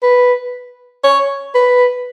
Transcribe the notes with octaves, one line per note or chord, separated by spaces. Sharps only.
B4
C#5
B4